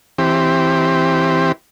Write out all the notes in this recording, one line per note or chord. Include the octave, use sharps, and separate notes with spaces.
E3 C4 G4